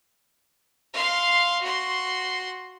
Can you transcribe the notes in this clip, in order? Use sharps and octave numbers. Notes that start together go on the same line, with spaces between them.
F5 C6
F#4 C6